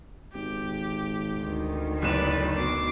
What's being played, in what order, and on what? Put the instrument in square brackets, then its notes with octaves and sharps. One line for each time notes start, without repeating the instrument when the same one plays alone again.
[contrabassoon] G#1 [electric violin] G4
[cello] D2 D#3
[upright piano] F#1 E7 [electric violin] B4 D5
[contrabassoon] B2 [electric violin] D6 C7